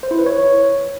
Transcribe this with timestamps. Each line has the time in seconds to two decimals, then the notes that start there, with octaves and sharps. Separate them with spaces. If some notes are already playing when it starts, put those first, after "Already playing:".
0.03 C5
0.11 E4
0.19 B4
0.26 C#5